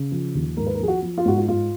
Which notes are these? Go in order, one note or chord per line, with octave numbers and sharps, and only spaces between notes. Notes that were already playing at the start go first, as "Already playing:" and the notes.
Already playing: C#3
F3
D#2
G#2 A#4
B4
A#4
F3 G#4
F#4
F3
F4
G#2 F#4
F4
G#2 F4